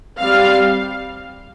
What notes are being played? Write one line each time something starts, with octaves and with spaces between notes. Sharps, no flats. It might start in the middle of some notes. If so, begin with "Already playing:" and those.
G3 C4 F5